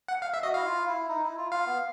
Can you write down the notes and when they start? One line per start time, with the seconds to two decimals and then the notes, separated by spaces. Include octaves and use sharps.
0.08 F#5
0.22 F5
0.34 E5
0.43 F#4 D#5
0.54 E4 F5
0.65 F4
0.87 E4
1.09 D#4
1.23 E4
1.37 F4
1.52 F4 F5
1.66 B3